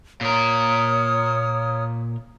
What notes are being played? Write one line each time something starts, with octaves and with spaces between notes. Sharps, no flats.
A#2 A#4 C#5 D#6 F6